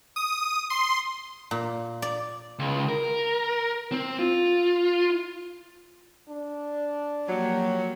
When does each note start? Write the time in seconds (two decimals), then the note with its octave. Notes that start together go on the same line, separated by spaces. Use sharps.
0.16 D#6
0.70 C6
1.51 A#2
2.02 D5
2.59 C#2
2.89 A#4
3.92 C4
4.19 F4
6.29 D4
7.28 F3 F#3 A#3 G4